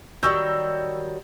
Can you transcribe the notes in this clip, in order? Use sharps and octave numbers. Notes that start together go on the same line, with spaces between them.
D#3 F#3 G3 C#6 E6 G6